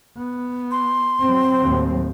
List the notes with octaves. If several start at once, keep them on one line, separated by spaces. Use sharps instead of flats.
B3
C6
F#3 C4
D#2 A2